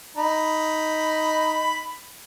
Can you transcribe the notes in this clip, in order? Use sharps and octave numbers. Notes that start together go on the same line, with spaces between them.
D#4 B5